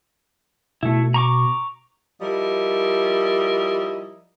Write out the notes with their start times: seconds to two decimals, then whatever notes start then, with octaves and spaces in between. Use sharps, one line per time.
0.83 B2 A3 E4
1.14 A#5 C#6 D6
2.21 F3 G3 E4 A#4 D#5